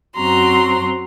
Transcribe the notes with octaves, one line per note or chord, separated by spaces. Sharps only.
F#2 C4 F#4 A#5 C6